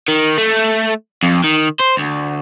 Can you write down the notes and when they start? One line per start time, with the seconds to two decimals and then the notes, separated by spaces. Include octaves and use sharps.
0.08 D#3
0.38 A3
1.23 F2
1.44 D#3
1.80 C5
1.97 D2